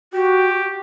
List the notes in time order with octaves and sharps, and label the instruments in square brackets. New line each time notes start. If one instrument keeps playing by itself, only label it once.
[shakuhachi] F#4 [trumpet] G4